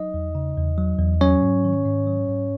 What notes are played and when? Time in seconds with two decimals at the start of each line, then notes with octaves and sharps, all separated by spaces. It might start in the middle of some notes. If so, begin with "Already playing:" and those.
Already playing: F#3 D#4 D#5
0.14 E2
0.35 C#3
0.57 E2
0.78 F#3
0.99 E2
1.21 F#3 C#4 C#5
1.42 G#2
1.64 D#3
1.86 G#2
2.07 F#3
2.28 G#2